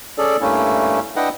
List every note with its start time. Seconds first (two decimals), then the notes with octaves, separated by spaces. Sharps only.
0.18 C#4 G#4 A4 D5
0.41 G2 A3 A#3 C#4 E4
1.16 D4 E4 B4 D#5 F#5 G5